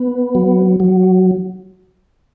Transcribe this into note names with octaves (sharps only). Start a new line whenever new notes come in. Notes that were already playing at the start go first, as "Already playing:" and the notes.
Already playing: B3
F#3
F#3